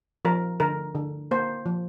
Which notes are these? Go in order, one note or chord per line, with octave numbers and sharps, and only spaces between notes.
F3 A#4
D3 A#4
D3
A#3 C5
F3